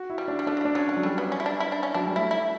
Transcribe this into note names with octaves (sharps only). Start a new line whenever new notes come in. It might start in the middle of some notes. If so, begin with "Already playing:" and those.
Already playing: F#4
E4
G3
D4
G3
A3 D4
F#3
G3
D4
F#3 C#4
G3
F#3
G3 A3
B3
C#4
E4
D4
E4
D4
C#4
F#3 D4
G3
A3 E4
E4